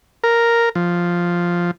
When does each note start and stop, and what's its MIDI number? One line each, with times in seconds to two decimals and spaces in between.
0.24 0.69 70
0.75 1.71 53